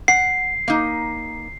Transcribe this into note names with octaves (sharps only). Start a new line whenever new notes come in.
F#5 C7
A#3 D#4